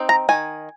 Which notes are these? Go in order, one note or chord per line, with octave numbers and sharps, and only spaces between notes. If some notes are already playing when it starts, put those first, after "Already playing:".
Already playing: C4 D#4
A#5
D#3 G#5